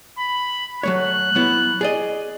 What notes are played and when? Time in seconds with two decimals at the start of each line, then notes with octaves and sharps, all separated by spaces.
0.18 B5
0.83 F#3 A3 C#5 F#6
1.35 F#3 B3 E4
1.81 G#4 D5 D#5